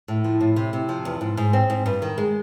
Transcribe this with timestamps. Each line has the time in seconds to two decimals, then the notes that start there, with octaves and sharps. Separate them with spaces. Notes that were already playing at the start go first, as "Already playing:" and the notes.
0.08 A2
0.24 F3
0.41 A2
0.56 C3
0.73 C3
0.89 F3
1.05 E2
1.21 G#2
1.37 G#2
1.53 C4
1.70 G#2
1.86 G2
2.02 D#3
2.18 G#3